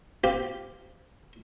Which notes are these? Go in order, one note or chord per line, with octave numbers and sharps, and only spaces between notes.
C4 F4 G4